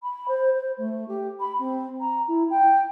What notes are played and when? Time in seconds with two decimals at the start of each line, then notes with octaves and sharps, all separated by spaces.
0.02 B5
0.28 C5
0.54 C5
0.77 A3
1.08 G4
1.39 B5
1.59 C4
2.00 A#5
2.28 E4
2.50 G5